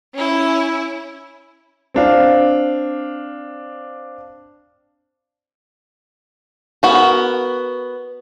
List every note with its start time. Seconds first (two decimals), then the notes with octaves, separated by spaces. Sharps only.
0.14 C#4 E4
1.94 C4 D4 F5
6.83 B3 F#4 A#4